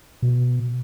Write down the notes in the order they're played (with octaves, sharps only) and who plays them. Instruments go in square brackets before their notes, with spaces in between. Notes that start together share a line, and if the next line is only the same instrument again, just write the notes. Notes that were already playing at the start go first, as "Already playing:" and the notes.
[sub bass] B2